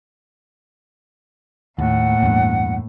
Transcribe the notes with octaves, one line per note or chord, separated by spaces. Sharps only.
D#2 A2 A#3 F#5
E2 G2